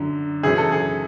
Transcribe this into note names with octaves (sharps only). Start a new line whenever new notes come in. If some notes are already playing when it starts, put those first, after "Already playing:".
Already playing: F#2 D3
F#2 C#3 E3 G#4
A4
G#4